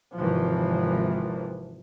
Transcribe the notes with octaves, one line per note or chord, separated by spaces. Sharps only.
G#1 C3 E3 F3